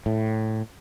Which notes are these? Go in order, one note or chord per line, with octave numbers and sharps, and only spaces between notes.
A2